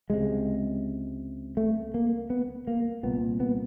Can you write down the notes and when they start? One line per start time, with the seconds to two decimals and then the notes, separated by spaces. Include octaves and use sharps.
0.10 C#2 C3 G#3
1.57 A3
1.94 A#3
2.30 B3
2.67 A#3
3.03 C2 A#2 B3
3.40 B3